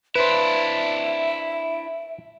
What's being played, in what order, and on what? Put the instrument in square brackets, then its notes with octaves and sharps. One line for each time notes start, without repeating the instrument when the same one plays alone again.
[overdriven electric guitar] D4 E4 [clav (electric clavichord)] B4 C5 [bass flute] E5